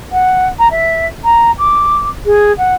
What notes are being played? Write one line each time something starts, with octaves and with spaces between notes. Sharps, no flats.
F#5
A#5
E5
A#5
D6
G#4
F#5